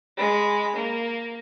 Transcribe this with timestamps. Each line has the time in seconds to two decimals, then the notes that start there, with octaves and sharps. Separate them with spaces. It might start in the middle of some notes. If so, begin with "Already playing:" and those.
0.18 G#3 B5
0.76 A#3